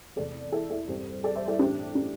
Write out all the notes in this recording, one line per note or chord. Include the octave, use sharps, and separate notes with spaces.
E2 C3 A3 C4 A4 D5
E4 A4
E4 A4
G2 G3 C4 G4 C5
A4 D5
C5 E5
E4 A4
A2 E3 C4 D4 G4
D4